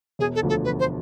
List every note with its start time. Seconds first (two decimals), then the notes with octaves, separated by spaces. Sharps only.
0.19 E1 G#4
0.35 A4
0.42 D2 D3 F3
0.49 A4
0.64 E1 B4
0.80 C5